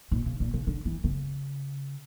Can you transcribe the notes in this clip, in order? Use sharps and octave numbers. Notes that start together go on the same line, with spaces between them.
A#2
C#3
A#2
C#3
D3
E3
C#3